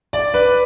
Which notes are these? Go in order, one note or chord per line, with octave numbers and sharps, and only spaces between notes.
D5
B4